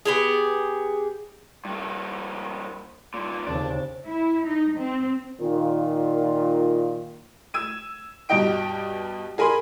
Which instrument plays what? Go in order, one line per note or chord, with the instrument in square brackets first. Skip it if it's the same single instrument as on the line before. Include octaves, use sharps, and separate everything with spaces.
[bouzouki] B3 G4 G#4
[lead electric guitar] G2 A#3
G2 A#2
[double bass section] D#2 C#3 C4 [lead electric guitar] D4
[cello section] E4
D#4
C4
[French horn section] A#2 D#3 F4
[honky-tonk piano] E6 G#6 D#7
G2 B2 G4 D#5 G5 D7
G#4 A#4 G#5 B5 C6